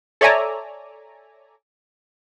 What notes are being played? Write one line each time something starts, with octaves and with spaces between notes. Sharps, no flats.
A4 C#5 D5 E5 G#5 A#5